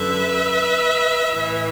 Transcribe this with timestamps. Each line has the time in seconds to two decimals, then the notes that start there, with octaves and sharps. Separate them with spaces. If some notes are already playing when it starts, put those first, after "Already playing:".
Already playing: F#2 D3 B4 E5
1.34 A2 E3